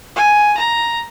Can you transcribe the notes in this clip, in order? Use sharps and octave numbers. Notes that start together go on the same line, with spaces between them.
G#5
A#5